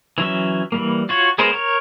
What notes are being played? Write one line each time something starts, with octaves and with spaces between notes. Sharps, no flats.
E3 F#3 C#4 E5
E3 G3 A#3
F4 F#4 C#5
G#3 B3 G#4 A#4 C5
A#4 C#5